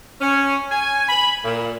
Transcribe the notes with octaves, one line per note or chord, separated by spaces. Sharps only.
C#4
G#5
B5
A#2